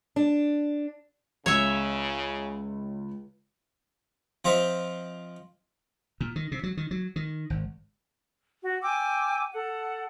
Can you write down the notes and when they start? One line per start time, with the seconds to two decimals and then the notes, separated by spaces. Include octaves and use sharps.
0.16 D4
1.46 C#2 C#3 C#5 E5
4.45 F3 C4 F4 D#5 E5
6.20 A#2
6.36 D#3
6.52 C3
6.63 F#3
6.77 D#3
6.91 F#3
7.16 D#3
7.50 G#1
8.62 F#4
8.82 G5 G#5 D6 E6
9.52 A4 F#5